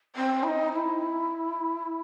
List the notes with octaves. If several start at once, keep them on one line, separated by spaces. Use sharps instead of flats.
C4
E4
D#4
E4